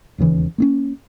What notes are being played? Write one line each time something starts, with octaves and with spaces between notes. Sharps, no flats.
E1 D#2 C#3 E3
A#3 C4 C#4